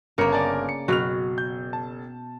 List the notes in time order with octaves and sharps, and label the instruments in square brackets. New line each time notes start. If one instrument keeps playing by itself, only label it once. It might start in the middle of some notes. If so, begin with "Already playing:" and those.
[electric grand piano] G1 A#4 C#7 [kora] C#3 A#3
[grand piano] D5 G#5 A5
[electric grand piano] C#7
[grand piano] F#1 F6 F7 [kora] B2 F#4
[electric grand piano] G6
A5